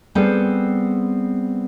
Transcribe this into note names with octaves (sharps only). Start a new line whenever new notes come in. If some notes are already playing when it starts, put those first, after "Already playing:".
G3 B3 C4 G#4 A4